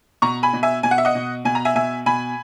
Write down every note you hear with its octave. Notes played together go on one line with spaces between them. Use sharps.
B2 A#5 C#6
G#5 B5
B2
E5 G#5
B2 G#5
F#5
E5
D#5 F#5
B2
B2 G#5
A#5
E5 G#5
B2 E5 G#5
B2 G#5 B5